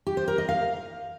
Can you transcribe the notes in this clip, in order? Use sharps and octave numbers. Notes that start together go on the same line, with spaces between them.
G4
C5
A#4
D#5
F5